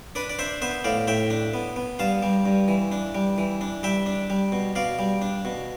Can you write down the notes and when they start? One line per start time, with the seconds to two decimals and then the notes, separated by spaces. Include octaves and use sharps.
0.15 D4 B4 D5
0.29 D5
0.39 D4 C5 E5
0.62 B3 C5 E5
0.84 A2 D5 F5
1.07 A2 E5 G5
1.30 D4
1.54 B3
1.76 B3
1.99 G2 F5 A5
2.23 G3
2.46 G2
2.68 E3
2.92 D4
3.15 G3
3.38 E3
3.61 D4
3.83 G3 E5 G5
4.06 D4
4.30 G3
4.52 B2
4.76 B2 D5 F5
4.99 G3
5.22 D4
5.45 B2